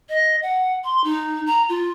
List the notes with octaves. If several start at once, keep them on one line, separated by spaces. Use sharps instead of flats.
D#5
F#5
C6
D#4
A#5
F4